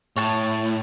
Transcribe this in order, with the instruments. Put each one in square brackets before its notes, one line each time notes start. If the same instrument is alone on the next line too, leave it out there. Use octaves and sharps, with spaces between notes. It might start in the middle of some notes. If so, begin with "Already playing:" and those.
[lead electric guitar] A2 [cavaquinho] C#5 A5